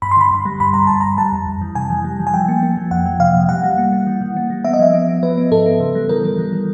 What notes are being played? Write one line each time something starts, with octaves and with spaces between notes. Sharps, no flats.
G2 B5
C6
D3 B5
G2
G3
G2 B5
G2 A#5
G2 A5
G2 A#5
G3 A5
F2
F2
E3
C3 G#5
E3
G3
E3
G#5
F3 G5
A#3
A#3
F3
F2 F#5
F3
C3 F5
C3
G3 F#5
G3
A#3
A#3
E3
E3
A#3
G3
B3 E5
D#5
F3 E5
B3
B3
F3 B4
B3
G#2 A4
B3
C#3
G3
E3 A#4
E3
G3
E3